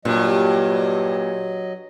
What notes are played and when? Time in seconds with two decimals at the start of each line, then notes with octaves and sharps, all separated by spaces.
0.05 G2 A#2 F#3 D#5